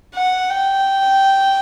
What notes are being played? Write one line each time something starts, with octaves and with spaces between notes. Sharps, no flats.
F#5
G5